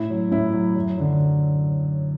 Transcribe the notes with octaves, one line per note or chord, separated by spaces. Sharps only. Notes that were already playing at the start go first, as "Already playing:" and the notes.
Already playing: A2 E4
F#3
A2 E4
F#3
F#2
D3 F#3